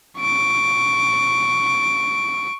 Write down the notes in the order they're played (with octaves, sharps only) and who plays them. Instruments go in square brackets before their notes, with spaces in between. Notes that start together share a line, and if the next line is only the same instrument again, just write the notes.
[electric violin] C#6 D7